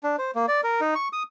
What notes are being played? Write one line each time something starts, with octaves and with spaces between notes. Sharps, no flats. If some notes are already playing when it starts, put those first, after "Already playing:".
D4
C5
A#3
D5
A#4
D#4
C#6
D#6